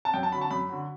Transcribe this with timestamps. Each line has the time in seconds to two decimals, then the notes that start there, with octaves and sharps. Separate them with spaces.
0.05 A5
0.14 F#2 G5
0.23 A5
0.32 D3 F#3 B5
0.41 A5
0.51 F#2 B5
0.69 D3 F#3